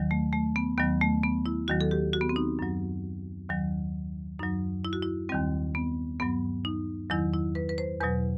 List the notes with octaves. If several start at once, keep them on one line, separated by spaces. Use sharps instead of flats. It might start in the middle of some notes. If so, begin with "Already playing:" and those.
Already playing: D#2 D#3 F#3
A3
A3
B3
D#2 D#3 F#3 B3
A3
B3
E4
D#2 D#3 F#3 F#4
A4
G4
F#4
B3
C4
D#4
F#2 F#3
D#2 D#3 F#3
F#2 F#3 D#4
E4
F#4
E4
D#2 D#3 G3 C4
B3
G2 F#3 B3
D#4
E2 D#3 F#3 E4
E4
B4
B4
C5
E2 B2 F#3 B4